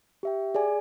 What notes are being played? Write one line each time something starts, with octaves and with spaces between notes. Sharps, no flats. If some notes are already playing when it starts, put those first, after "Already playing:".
G4 E5 G5
G#4 D5 G#5